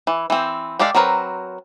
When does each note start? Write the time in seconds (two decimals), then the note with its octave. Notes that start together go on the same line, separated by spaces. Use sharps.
0.07 E3
0.30 E3 C4
0.79 G#3 G4 A4 D5 F5
0.95 F#3 C4 A#4 B4